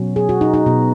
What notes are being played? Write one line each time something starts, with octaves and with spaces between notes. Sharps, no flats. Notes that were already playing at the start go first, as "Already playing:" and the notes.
Already playing: B2 F#3 C#4
G#4
F#4
D#4
D#4
B2 B3